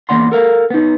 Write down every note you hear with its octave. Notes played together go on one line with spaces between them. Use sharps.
E2 F3 A#3 D5 F#5 C6
A4 A#4 F5
B3 D#4